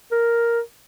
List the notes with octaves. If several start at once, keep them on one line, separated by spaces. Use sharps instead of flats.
A#4